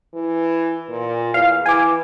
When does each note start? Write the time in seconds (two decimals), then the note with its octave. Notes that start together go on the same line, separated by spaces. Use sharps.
0.13 E3
0.89 A#2
1.34 E2 F5
1.66 E3 G#5 D6